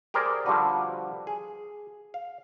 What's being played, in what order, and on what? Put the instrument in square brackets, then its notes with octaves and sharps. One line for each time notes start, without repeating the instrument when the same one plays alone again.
[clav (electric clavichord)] G4 G#4 A#4 C5 D5
D3 F3 G3 D4 F#4 B4
G#4
F5